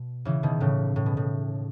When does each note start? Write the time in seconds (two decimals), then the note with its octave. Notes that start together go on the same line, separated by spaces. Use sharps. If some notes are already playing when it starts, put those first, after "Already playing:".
Already playing: B2
0.25 C#3 E3
0.43 B2 D#3
0.60 A2 C#3
0.96 A2
1.06 B2
1.17 A2